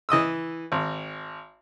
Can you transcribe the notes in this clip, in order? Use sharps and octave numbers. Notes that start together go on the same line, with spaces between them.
E3 D#5 D#6 E6
G#1